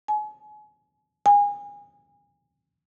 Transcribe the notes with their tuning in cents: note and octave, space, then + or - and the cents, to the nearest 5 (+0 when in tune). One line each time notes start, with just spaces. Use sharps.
G#5 +35
G#5 -30